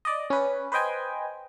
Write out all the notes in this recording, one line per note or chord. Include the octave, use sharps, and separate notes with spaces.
D5 D#5
C#4 B4
B4 C5 D#5 G5 G#5